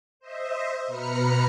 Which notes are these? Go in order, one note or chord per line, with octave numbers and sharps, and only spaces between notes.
C5 D#5 E5
B2 B4 A#5 B5 F6 C#7